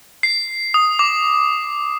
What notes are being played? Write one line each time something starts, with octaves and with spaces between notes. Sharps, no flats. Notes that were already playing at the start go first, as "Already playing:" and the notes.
C7
D#6
D6